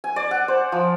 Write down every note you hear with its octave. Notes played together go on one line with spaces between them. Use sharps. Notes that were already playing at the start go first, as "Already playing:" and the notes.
G#5
D5
F#5
C5
F3